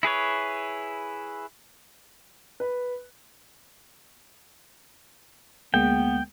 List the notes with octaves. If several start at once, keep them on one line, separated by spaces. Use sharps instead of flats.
E4 G#4 B4 C#5
B4
D2 G#3 A#3 B3 G5